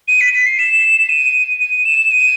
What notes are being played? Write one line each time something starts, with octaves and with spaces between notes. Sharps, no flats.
D#7
B6
B6
C7
E7
D#7
D#7
E7
D#7